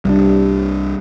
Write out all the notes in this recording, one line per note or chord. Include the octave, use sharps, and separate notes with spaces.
C2 G3 D4